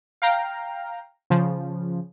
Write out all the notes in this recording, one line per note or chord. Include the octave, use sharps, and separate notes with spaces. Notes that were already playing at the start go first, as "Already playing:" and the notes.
F5 G5 A#5
C#3 F3